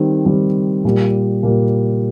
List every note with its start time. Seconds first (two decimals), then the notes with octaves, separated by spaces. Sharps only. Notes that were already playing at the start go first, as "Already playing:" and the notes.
Already playing: D#3 G3 C4
0.26 D#3 G3 C4
0.84 A#2 G3 A#3
1.43 A#2 G3 A#3